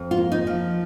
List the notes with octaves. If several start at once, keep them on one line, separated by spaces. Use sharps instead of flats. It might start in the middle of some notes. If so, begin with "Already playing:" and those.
Already playing: F2
F4
A#3
D#4
F3